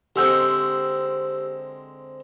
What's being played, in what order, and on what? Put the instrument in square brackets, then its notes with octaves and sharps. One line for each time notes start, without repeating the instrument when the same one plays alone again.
[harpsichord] D3 G#3 C4 [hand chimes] G4 E6 G6